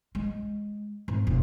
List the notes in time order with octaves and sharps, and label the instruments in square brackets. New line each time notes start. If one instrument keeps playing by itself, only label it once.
[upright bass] G#3
G#1
E1